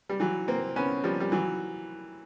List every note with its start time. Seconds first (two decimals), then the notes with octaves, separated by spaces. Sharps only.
0.09 G3
0.20 E3 F#3
0.48 A#3 C4
0.76 B3 C#4
1.04 F3 G3
1.20 G3
1.32 E3 F#3